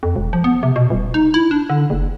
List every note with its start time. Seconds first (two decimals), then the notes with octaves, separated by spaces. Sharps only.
0.03 F2
0.16 E1
0.33 F3
0.44 B3
0.63 C3
0.76 B2
0.90 D#1
1.14 D#4
1.34 E4
1.51 D4
1.70 D3
1.90 F#1